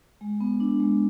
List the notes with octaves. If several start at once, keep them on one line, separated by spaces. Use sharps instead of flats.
G#3
B3
D4
G#3